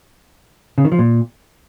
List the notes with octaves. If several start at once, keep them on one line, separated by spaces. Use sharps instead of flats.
C#3
D#3
F3
A#2